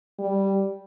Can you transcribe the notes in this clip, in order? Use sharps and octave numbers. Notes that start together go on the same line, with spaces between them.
G3